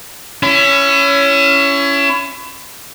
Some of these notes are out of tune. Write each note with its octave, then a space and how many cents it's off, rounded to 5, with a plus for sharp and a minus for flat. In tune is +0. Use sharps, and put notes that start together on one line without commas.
C#4 +15 E4 +30